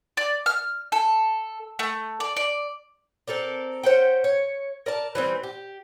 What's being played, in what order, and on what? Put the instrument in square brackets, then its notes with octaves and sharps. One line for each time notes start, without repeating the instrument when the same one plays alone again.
[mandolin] D5
F6
A4
A3
D5
D5
[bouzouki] C4 A4 A#4 D5
C#4 C5 F#5 G5
C#5
A#4 D5 A5
E3 G3 C4
G4